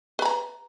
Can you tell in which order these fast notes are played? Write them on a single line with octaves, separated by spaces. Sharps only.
B4 B5 A#5